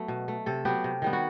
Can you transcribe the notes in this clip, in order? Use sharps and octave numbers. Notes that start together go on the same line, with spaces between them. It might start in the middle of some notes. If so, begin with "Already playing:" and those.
Already playing: F#3 A3 B3
B2
A3
C3 A4
F#3 B3 G4
C3
D#3 G3 B3
F#4